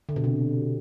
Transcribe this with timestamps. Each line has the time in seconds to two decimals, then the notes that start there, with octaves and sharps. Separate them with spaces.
0.09 D3
0.16 B2
0.24 C3